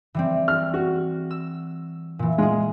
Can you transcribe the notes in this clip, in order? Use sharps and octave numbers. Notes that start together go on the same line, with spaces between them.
E3 G3 C4
F6
F#4
E6
A#2 E3
G#3 F4 G#4